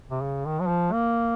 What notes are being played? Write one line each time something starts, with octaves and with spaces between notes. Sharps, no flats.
C3
C#3
D#3
F#3
F3
A#3